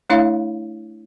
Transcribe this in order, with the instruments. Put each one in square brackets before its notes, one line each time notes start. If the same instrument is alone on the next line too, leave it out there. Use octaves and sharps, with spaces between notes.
[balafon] A3 D4 E4 C#5 E5 F5